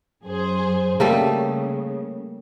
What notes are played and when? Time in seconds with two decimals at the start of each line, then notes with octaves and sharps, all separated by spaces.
0.24 F#2 G#4 C5
1.00 C#3 G3 A3 A#3